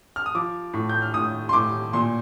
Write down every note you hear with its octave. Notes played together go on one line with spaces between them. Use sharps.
F6
D#6
F3 D6
A2
G6
F6
A2 D#6
C6
A2 D6
A#2 C6